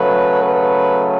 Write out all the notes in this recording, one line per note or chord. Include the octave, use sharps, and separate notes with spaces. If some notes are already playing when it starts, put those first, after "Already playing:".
Already playing: C#3 F#3 A3 B4
B4